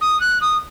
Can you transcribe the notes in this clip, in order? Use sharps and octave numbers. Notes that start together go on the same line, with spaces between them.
D#6
F#6
D#6